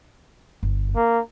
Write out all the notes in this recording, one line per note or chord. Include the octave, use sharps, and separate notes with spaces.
G1
A#3 D4